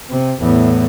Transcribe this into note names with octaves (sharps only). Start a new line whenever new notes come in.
C3
E2 A2